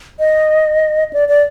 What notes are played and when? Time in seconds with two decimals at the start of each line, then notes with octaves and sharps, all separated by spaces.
0.19 D#5
1.13 D5
1.29 D5